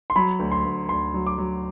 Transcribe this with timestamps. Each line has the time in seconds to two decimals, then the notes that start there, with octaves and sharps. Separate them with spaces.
0.10 C6
0.16 F#3 B5
0.39 D2
0.52 C6
0.64 D2
0.89 D2 C6
1.14 F#3
1.27 D6
1.38 F#3